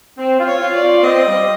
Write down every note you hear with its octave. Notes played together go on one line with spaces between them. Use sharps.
C4
F4
C#5
F4
D5
F4
C4 D#5
G3